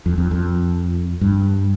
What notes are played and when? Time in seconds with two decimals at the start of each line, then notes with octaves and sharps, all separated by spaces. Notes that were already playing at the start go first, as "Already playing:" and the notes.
0.06 F2
0.18 F2
0.31 F2
1.21 G2